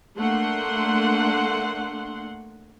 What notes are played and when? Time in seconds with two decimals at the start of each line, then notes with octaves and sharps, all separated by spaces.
0.19 A3 A#3 D4 F#5 C6